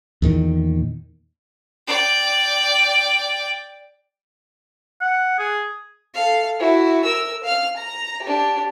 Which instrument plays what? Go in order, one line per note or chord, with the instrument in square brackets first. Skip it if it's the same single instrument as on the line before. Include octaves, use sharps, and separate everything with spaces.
[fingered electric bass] E2 A#2 D#3
[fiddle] D5 G5
[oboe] F#5
G#4
[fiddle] A4 F5
E4 F#4
A#4 E6
F5 F6
A#5
D4 G4